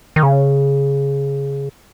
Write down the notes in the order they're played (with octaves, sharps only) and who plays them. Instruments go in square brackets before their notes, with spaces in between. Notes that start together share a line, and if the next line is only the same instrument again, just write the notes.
[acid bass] D#3
C#3